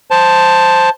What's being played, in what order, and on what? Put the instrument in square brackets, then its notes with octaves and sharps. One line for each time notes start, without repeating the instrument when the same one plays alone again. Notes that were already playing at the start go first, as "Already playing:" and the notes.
[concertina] C5 A5